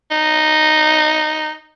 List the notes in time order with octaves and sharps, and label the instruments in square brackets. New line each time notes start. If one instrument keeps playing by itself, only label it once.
[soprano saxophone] D#4